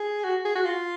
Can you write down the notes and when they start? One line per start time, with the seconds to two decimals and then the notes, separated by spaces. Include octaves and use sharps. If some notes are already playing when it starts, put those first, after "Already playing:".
Already playing: G#4
0.24 F#4
0.45 G#4
0.55 F#4
0.66 F4